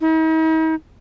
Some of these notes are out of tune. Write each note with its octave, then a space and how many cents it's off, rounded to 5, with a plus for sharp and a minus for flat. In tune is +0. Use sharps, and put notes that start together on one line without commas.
D#4 +45